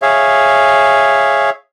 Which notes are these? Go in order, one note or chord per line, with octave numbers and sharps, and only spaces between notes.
G#4 C#5 E5 F5